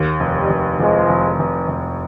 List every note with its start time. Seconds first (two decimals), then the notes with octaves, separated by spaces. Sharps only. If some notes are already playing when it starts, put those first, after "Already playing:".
Already playing: D#2
0.20 F1
0.35 D#3 G3
0.50 F1
0.79 F1 F3 G#3
1.09 F1
1.39 F1
1.68 F1